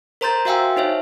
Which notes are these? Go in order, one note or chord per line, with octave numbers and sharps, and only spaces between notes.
A#4 C5 A#5 C6 G6 A6
F#4 E5 F5 G5 G#5 E6
D#4 C5 C#5 E5